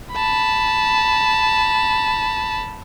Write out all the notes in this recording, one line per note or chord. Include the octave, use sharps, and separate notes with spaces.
A5 B5